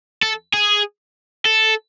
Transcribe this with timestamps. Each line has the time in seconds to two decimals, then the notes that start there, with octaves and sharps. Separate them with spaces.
0.23 A4
0.53 G#4
1.45 A4